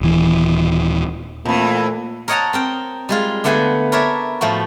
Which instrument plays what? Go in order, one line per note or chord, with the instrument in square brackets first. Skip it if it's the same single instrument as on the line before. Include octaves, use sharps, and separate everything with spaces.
[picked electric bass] D#1 E3
[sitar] F2 E3 [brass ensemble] A#2 A3
[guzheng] A#4 C#5 D#5 F#5 A5 A#5
C4 A#4 G5
G3 G#3 F4
D3 A3 B3 F#5 G#5 C6
A#4 B4 C#5 D5 E5 A5
A2 F3 A3 F#4